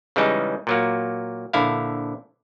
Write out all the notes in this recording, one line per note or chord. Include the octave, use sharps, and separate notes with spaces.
C#3 E3 G3 G#3 C#4 D#4
A#2 F#3 A#3
A#1 D3 E4 F5